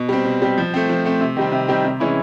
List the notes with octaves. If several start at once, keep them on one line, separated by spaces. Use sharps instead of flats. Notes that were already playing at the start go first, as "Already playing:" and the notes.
Already playing: B2
G3 C4
B2
G3 C4
F3
A3 C4
F3
A3 C4
C3
D#3 G3 C4
C3
D#3 G3 C4
C3
E3 G#3 C#4 E4